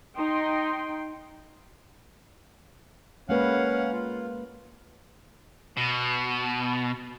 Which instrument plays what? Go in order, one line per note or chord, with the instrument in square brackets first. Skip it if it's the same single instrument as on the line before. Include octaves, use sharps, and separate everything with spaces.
[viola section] D#4 G5 C6
[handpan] G#3 A#3 B4 [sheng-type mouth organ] C#4 F5 F#5
[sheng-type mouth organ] F4
[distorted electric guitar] B2